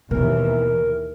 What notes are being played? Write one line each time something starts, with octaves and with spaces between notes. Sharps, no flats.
D#2 B2 E3 A#4